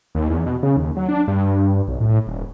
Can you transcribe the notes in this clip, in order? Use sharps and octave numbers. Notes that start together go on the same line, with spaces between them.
D#2
E2
B2
C#3
D#2
F#3
D4
G2
B1
A2
D#1